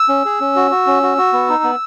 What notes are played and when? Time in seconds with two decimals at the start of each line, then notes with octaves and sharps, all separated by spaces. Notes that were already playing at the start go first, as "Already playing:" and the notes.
Already playing: E6
0.09 C#4
0.25 G#4
0.40 C#4
0.56 F#4
0.71 F#4
0.87 C#4
1.03 F#4
1.18 F#4
1.33 B3
1.49 D#4
1.64 B3